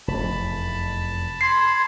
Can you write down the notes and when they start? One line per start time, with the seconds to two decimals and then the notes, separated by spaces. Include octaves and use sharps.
0.08 F1 E2 A5 B5
1.41 C6 G#6 C7